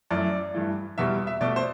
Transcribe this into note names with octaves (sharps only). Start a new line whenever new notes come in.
F#2 E3 A3 D5
G2 E3 A3
E2 B2 G3 E5
E5
B2 A3 D5
C5